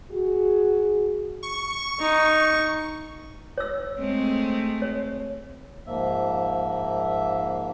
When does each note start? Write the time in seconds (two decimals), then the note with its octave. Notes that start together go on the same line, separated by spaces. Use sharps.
0.11 F#4 G#4
1.43 C#6
2.00 D#4
3.58 C#5 E6
3.98 G#3 A3 C4
4.82 C#5
5.86 G#2 F3 A#3 E5